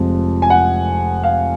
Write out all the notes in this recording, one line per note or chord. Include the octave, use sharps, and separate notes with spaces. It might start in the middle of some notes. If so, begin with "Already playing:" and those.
Already playing: F1 F2 F3 G#3
G#5
F#5
F5